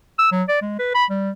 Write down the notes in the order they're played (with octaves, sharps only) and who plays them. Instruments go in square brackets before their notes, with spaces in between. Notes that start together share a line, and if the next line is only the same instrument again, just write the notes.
[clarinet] E6
F#3
D5
G#3
B4
B5
G3